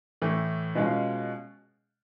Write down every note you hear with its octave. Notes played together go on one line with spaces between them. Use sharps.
A2 E3 A3
B2 G#3 C#4 F4